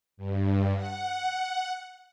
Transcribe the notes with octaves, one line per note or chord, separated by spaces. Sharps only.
G2
F#5